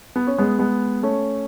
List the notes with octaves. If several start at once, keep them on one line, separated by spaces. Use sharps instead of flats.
B3
C#4
G#3 B3
G#3 B3
A3 C#4